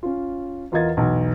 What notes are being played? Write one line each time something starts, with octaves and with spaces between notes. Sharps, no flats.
C#4 F4
E2 F4 A#4 D#5 G#6 A6
B1 E2